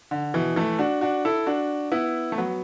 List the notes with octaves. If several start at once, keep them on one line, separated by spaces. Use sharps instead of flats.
D3
B2 E3
E3 A3
D4 F#4
D4 F#4
E4 A4
D4 F#4
B3 E4
A3
F#3 B3